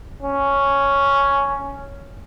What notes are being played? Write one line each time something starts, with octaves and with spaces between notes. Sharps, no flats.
C#4